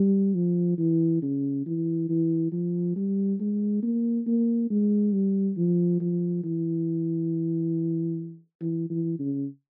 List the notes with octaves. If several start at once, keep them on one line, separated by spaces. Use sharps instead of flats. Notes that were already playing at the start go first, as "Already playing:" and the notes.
Already playing: G3
F3
E3
C#3
E3
E3
F3
G3
G#3
A#3
A#3
G#3
G3
F3
F3
E3
E3
E3
C#3